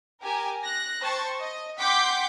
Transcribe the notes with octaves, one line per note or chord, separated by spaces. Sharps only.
G4 A#4 G#5
F#6 A#6
C5 G5 A5 C#6
D#5
F#5 G5 C6 D6 G6 B6